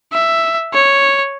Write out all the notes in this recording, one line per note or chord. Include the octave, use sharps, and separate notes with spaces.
E5
C#5